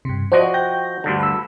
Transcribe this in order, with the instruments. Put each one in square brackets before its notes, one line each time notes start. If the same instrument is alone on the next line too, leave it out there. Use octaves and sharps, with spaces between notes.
[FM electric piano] G2 C3
[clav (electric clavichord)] F3 F#4 D#5 [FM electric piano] C5 D5
[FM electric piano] G5 G6 A#6
[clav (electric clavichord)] D2 G2 D3
[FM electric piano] B5 E6